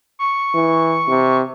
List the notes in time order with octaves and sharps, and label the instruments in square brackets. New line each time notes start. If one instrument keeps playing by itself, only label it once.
[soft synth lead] C#6
[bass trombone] E3
C3